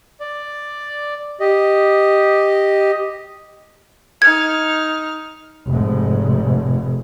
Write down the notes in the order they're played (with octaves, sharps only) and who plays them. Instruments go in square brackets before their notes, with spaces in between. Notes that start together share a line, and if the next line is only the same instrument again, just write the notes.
[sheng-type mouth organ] D5
G4 D#5
[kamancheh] D#4 F6 [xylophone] G#6
[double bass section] F1 G#2